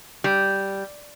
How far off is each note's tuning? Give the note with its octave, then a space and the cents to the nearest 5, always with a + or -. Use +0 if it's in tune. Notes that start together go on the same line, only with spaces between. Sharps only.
G3 -5